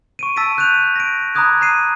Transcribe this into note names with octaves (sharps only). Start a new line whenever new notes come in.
C#6 D7 D#7
A5 E6 A6 B6 D7 D#7
E6 F#6 G6 D7 D#7 F7
A#6 D7
A#5 B5 D6 D#6 F#6 G#6
A#5 F#6 C7 D#7